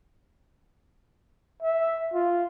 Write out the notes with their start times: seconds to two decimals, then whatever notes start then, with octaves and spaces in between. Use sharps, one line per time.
1.63 E5
2.14 F4